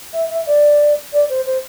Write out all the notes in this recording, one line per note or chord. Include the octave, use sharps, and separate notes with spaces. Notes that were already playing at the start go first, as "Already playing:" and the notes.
E5
E5
D5
D5
C5
C5